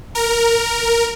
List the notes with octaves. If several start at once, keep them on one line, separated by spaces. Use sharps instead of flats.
A#4